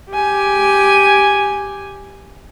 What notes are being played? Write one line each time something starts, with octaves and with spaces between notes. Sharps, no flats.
G4 G#5